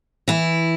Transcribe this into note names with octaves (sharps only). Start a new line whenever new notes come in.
E3 E4